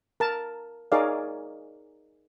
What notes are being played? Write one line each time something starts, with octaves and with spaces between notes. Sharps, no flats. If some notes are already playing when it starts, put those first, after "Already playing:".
A#4 A5
D#4 G#4 A#4 C#5 D5 F5